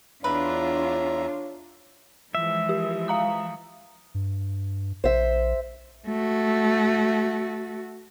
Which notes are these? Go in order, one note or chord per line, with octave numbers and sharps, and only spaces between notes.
E2 D4 F4 B4 C#5 E5 A#5
E3 F3 G#3 E5
G4
F5 A#5 D#6
G2
A#1 C5 E5
A3 F#4